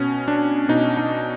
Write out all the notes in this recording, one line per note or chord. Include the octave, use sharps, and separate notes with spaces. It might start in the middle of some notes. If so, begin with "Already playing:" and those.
Already playing: B2 C#4
D4
B2 D#4
D#4